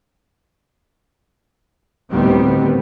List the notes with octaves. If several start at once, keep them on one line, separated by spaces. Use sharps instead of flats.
D2 A2 D#3 G3 B3 C4